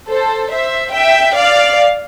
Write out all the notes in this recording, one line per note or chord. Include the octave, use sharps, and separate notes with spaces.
A4 C5
C5 E5
E5 G5
D5 F5